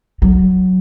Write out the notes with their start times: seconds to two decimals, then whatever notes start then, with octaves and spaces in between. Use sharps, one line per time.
0.22 F#3